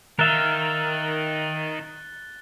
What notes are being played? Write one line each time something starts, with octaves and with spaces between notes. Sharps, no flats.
D#3 A#4 E5 F5 F#6 A6 G7